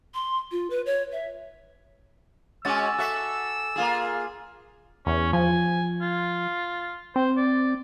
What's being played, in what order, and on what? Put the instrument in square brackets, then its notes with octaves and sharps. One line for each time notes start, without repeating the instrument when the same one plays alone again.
[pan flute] C6
F4
B4
C#5
E5
[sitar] G#3 C#4 F#4 [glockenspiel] G#5 D6 A6 [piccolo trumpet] E6
[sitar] F#4 A4 E5
A#3 F4 G#4
[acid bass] E2 [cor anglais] C#4
[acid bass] F3 [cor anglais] G#5
[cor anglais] F4
[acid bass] C4 [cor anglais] C5
[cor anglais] D5